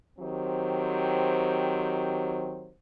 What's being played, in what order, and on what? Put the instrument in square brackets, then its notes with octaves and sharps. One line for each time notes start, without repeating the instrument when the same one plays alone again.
[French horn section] D#3 F#3 C4 G4 C5